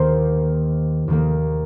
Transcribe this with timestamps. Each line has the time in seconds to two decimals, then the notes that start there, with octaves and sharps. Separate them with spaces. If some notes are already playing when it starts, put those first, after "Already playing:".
Already playing: D#2 D#3 A#3 C5
1.08 D#2 D#3 A#3